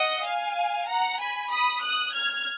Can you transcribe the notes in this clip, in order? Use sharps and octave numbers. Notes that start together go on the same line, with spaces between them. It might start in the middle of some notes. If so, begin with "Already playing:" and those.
Already playing: D#5 F#5
F5 G#5
F#5 A#5
G#5 B5
B5 D#6
D#6 F#6
F6 G#6